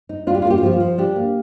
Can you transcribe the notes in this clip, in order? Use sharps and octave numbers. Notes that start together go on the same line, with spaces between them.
D#4
D4 F4
G4
A#3 F4
G4
F4
F3 G4
F4
F3
D4 G4
A#3